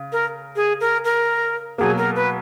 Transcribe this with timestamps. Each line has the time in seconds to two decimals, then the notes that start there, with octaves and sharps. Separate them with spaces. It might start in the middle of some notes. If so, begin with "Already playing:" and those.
Already playing: C#3
0.12 A#4
0.56 G#4
0.80 A#4
1.05 A#4
1.78 B2 F#3 A#3 G#4
1.98 A#4
2.16 B4